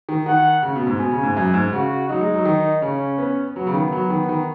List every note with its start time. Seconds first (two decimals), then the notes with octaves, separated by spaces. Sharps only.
0.09 D#3
0.26 D#3 F#5
0.63 C#3
0.75 B2
0.87 G#2
0.99 B2 G#5
1.11 C#3
1.23 G#2
1.37 F#2
1.54 G#2
1.72 C#3 F#4
2.09 F#3 D#4
2.21 G#3
2.33 F#3
2.45 D#3
2.82 C#3 C#4
3.18 B3
3.55 F#3 B3
3.67 C#3
3.74 D#3
3.92 F#3
4.10 D#3
4.29 D#3